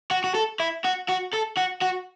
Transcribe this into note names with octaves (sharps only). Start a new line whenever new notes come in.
F#4
F#4
A4
E4
F#4
F#4
A4
F#4
F#4